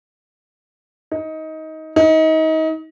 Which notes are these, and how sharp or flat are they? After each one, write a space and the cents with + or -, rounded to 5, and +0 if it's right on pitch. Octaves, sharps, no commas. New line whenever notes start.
D#4 +20
D#4 +30